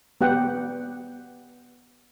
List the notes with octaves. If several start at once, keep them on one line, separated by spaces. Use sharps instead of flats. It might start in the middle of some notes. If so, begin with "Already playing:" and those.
B3 G4 F#5 G5